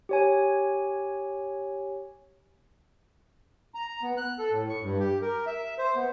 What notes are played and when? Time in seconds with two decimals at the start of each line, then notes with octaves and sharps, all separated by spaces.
0.09 G4 C#5 G#5
3.75 A#5
4.03 B3
4.17 F#6
4.39 A4
4.51 A2
4.69 C#6
4.82 G2
5.00 G4
5.22 A#4
5.47 E5
5.78 C5
5.96 B3